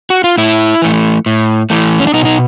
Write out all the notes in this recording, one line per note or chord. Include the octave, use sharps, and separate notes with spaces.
F#4
F4
A2 E4
E3 A3
A2
E3 A3
C#4
D4
B2 D#4
D#4